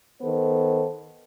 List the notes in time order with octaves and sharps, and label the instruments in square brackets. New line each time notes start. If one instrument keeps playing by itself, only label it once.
[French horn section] D#3 B3 A4 C5